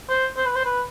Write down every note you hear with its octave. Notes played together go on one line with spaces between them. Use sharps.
C5
C5
B4
C5
B4